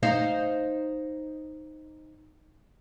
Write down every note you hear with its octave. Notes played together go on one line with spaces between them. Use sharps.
D#4 C5 F5